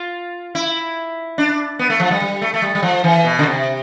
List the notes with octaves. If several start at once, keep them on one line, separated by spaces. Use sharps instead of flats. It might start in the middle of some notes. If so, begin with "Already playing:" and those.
Already playing: F4
E4
D4
B3
A3
F3
G3
G3
A3
A3
G3
G3
F3
E3
B2
D3
C3